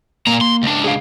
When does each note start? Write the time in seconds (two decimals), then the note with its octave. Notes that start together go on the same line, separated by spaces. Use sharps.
0.27 A#2 A#3 A#5
0.41 C6
0.63 C#2 D4
0.84 G#4 F5